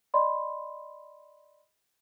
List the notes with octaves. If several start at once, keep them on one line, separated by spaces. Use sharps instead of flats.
D5 D#5 B5 C6